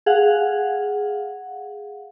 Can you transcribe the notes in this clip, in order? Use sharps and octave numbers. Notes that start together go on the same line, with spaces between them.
G#4 F5 F#5